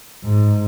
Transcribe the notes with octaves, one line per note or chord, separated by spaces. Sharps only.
G#2